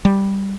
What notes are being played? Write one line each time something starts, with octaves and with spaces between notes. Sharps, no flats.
G3